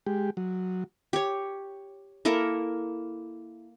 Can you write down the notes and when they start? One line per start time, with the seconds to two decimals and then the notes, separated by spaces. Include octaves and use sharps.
0.06 G#3 G4
0.37 F#3
1.13 G4 C#5
2.25 A#3 E4 A4 A#4